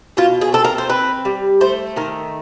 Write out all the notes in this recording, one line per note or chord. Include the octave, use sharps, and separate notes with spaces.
B2 F4
G#4
C4 A4
A#4
C5
C4 B4
G3
A3 C5
D#3 A#4